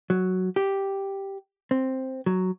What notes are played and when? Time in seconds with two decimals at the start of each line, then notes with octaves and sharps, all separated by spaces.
0.10 F#3
0.56 G4
1.71 C4
2.26 F#3